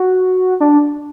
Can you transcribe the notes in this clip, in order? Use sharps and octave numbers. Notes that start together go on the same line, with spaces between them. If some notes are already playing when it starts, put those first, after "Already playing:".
Already playing: F#4
D4